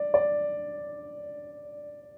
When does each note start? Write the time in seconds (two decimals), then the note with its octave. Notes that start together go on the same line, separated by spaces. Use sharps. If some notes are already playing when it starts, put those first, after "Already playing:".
Already playing: D5
0.14 D5